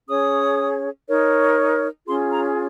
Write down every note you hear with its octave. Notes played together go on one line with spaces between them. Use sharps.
C#4 G#4 C#5 D#6
D#4 A#4 C#5
C#4 F4 G#4 C6
A#5